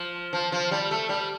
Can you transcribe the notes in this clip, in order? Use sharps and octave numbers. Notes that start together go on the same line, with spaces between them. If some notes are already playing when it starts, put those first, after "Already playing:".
Already playing: F3
F3
F3
G3
A3
G3